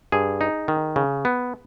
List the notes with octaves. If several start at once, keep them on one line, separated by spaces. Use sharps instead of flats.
G2 G#4
D#4
D#3
C#3
B3